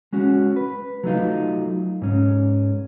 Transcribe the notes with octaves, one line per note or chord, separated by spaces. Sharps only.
G#3 C#4 F#4
B4
F#3 A3 D#4 F4
G#2 C#4